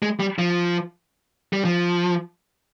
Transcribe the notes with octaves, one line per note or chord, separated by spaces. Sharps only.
G#3
G3
F3
G3
F3